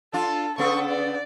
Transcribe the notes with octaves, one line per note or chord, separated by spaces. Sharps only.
D4 F4 A4
C#3 B3 A4 C#6
D5